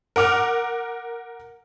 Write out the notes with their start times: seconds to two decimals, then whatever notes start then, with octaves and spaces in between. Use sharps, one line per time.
0.16 A#4 F#5 D6 F6